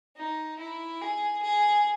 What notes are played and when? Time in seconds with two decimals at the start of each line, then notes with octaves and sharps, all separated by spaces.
0.17 D#4
0.59 E4
1.01 G#4
1.42 G#4